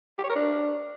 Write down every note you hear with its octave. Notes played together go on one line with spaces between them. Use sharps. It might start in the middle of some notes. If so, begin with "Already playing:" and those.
G4
C#5
A#4
D4